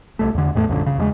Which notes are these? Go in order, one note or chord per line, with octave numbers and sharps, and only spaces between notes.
C2 F2 A3
E2 D3
E2 A2 G#3 A3
C2 F#2 A#2 D3
C#3
E2 F3 G#3